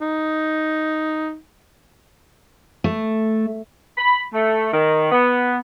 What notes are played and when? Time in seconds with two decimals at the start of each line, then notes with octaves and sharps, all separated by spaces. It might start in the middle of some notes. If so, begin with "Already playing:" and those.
0.01 D#4
2.84 A3
3.98 B5
4.34 A3
4.73 D#3
5.12 B3